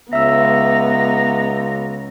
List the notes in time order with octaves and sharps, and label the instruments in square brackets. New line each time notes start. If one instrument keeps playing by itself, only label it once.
[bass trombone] C#2 [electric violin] B3 [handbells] E5 E6 [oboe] A#5